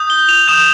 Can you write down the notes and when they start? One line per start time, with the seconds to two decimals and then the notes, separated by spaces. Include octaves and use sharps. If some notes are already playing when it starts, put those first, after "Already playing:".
Already playing: D#6 G6
0.10 G7
0.29 F7
0.48 D#6 G6 E7